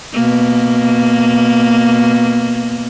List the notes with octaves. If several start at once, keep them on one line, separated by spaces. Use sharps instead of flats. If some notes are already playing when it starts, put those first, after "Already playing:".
B2 A#3